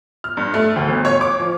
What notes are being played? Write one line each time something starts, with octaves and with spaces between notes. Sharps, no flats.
F6
G2
A3
D2
G1
C#5
D6
F3